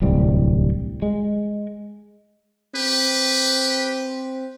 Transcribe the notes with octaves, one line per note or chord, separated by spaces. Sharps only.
D1 C2 G3
G#3
C4 G4 B4